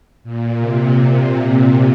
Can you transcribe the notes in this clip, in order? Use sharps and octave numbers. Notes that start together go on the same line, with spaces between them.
A#2
C3
C3